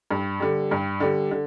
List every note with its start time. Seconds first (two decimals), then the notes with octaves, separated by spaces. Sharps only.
0.11 G2
0.40 D3 G3
0.71 G2
1.00 D3 G3
1.31 D3